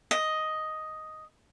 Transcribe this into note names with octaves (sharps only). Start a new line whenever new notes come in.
D#5